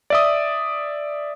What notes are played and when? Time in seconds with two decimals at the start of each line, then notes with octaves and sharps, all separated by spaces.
0.10 D5 E5 D#6